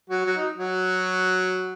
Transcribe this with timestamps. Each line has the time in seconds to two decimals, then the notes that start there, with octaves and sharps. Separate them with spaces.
0.10 F#3 F#4
0.25 F#3 F#4
0.36 D#4
0.58 F#3 F#4